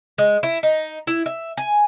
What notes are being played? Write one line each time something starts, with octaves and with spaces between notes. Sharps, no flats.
G#3
E4
D#4
E4
E5
G#5